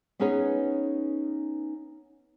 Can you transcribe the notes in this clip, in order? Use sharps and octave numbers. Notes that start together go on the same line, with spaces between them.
B3 C#4 D#4 G#4 B4 C#5